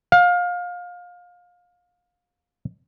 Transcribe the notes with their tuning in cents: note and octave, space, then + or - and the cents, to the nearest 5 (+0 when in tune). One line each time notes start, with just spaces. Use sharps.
F5 +25